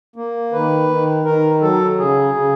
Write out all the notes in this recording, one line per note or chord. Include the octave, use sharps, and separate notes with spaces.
A#3
D#3 B4
D#3
D#3 A#4
F#3 A4
C#3 G#4
C#3